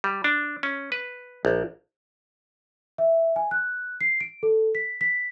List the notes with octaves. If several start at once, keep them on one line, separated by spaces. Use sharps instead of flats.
G3
D4
C#4
B4
A#1
E5
G#5
F#6
C7
D7
A4
B6
B6